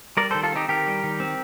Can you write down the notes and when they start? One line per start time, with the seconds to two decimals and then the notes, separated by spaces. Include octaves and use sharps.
0.17 G3 A#4 D5
0.31 A4 C5
0.35 D#3
0.43 F4 A4
0.52 C4 D#4 G4
0.69 D#3 G4 A#4
0.87 G3
1.04 D#3
1.20 C4